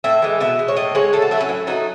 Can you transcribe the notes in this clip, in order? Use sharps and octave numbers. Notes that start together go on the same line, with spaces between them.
A2 E5
E3 G#3
B2 E5
G#3
C#5
A2 D#5
G#3 C#5
A2 A4
F#4
F#3 A3 E4
C#4
A2
F#3 A3 D#4